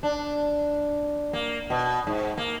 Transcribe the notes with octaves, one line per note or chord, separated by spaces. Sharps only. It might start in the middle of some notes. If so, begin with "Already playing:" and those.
D4
A#3
B2
G#2
A#3